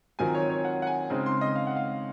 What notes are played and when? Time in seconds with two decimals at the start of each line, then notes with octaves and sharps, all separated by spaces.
0.19 D#3 F#3 C4 F4 G#5
0.35 C#5
0.50 C#5
0.65 F#5
0.82 F#5
0.87 G#5
1.10 C#3 G#3 C4 D#4
1.26 C6
1.41 D#5
1.56 F5
1.67 F#5
1.76 F5